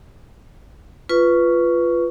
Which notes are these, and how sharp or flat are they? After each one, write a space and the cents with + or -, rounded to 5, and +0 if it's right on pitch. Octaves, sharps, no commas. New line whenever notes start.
F4 -10 B4 +0 C#6 +15